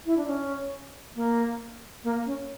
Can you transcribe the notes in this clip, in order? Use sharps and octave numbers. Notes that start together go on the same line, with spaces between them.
E4
D4
C#4
A#3
A#3
C#4